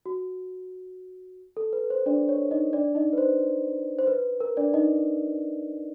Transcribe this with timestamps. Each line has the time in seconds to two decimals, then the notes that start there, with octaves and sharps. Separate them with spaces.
0.06 F#4
1.57 A4
1.73 B4
1.90 C5
2.06 D4 D5
2.29 C#5
2.51 D#4 D#5
2.73 D4 D5
2.95 D#4 D#5
3.13 B4
3.18 C5
3.99 C5
4.07 B4
4.40 A#4
4.57 D4 D5
4.74 D#4 D#5